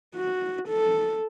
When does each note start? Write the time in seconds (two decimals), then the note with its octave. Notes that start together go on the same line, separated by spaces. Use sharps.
0.16 F#4
0.69 A4